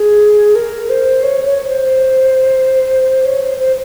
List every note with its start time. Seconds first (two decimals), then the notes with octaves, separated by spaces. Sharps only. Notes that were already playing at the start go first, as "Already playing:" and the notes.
Already playing: G#4
0.55 A#4
0.90 C5
1.23 C#5
1.46 C#5
1.68 C5
3.26 C#5
3.42 C5
3.60 C5